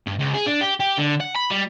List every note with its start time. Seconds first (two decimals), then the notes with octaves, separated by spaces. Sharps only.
0.07 G2
0.19 C#2
0.34 G#4
0.46 D4
0.61 G4
0.80 G4
0.98 D3
1.20 F#5
1.35 B5
1.50 G3